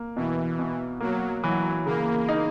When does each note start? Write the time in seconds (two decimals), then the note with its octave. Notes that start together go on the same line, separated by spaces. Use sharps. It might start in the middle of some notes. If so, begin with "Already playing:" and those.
Already playing: A#3
0.17 B2 E3
0.59 B2
1.00 F#3 A#3
1.43 E3 F#3
1.86 C#3 A#3
2.29 D#4